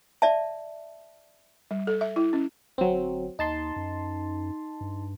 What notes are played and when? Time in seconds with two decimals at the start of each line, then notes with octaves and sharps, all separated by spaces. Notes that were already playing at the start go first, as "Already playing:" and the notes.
0.22 D5 E5 A5
1.71 G3
1.87 A4
2.01 E5
2.16 E4
2.33 C#4
2.78 G1 F#3 C4
3.39 D#2 D#4 A5 C6
3.76 F#2
4.81 G2